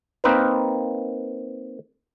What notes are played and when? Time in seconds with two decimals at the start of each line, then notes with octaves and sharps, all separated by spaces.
0.24 A#3 C4 D#4 A#4 B4